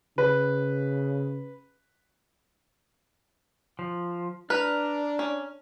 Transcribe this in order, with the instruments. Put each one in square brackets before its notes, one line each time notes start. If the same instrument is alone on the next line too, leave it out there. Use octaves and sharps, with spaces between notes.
[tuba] C#3 [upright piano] B4
[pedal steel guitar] F3
[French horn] D4 [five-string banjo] B4 [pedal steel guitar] A#5 F6
[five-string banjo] C#4